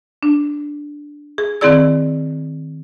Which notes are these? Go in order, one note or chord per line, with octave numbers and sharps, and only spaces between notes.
D4
G#4
D#3 C4 E4 G#4 D5 E6